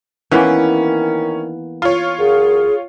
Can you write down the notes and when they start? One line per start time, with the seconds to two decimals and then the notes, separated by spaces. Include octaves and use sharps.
0.31 D#3 E3 A#3 B3 C#4
1.82 F4 C#5
2.19 F#2 G#4